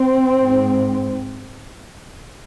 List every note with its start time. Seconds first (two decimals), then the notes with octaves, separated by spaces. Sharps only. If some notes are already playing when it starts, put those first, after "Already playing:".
Already playing: C4
0.37 G#2